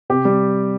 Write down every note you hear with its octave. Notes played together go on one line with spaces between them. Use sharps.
C3 G4
G3